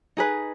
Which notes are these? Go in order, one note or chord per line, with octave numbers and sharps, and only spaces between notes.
D#4 G#4 B4